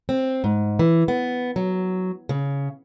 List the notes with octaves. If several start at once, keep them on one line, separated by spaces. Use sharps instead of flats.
C4
G#2
E3
B3
F#3
C#3